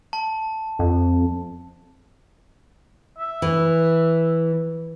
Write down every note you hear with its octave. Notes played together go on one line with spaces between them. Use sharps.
A5
F2
E5
E3